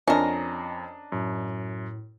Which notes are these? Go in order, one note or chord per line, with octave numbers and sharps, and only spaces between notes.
F2 C#4 D4 A#4 D#5
F#2 A2